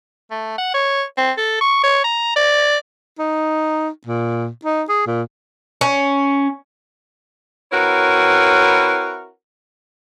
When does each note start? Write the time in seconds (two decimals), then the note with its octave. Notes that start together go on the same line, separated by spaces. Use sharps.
0.31 A3
0.58 F#5
0.74 C#5
1.18 C4
1.38 A4
1.61 C#6
1.83 C#5
2.04 A#5
2.36 D5
3.19 D#4
4.06 A#2
4.65 D#4
4.89 G#4
5.06 A#2
5.81 C#4
7.72 C4 E4 F#4 A#4 B4 C#5